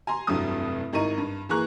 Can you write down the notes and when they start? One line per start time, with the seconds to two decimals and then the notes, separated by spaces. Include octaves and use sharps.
0.07 G#5 A#5 C6
0.27 F1 C2 G2 F#3 D#6
0.93 G#1 D#4 E4 A#4 C#6 D#7
1.18 G2
1.49 E3 A#3 G#4 A#5 C#6 F#6